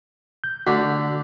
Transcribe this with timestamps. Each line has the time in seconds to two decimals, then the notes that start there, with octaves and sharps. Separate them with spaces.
0.44 G6
0.67 D3 A3 D4 F#4 B5